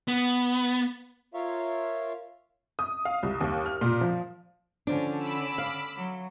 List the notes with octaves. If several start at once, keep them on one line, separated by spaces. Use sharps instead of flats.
B3
F4 A#4 C#5 E5 F5
D#6
F5
C2
D#2
F6
A#2
F3
D3 F3 C#4 D4
B5 D6 E6
F5
F#3